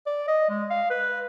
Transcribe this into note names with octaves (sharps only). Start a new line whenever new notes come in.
D5
D#5
G#3
F5
B4